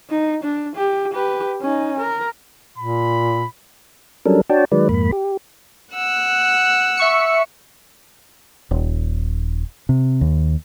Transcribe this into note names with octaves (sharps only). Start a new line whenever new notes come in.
D#4
D4
G4
G4 B4
C#4 D#4
A#4
A#2 B5
F#3 G3 C#4 D4 A4 A#4
D4 F#4 C#5 D5 G5 A5
D#3 F#3 G#3 B4 D5
F2 G#2 A#3 B5
G4
F#5 E6 F#6
E5 C#6 C#7
D#1
C3
D#2